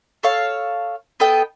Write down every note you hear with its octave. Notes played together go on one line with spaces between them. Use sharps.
A4 C#5 F5
B3 A4 D#5 G5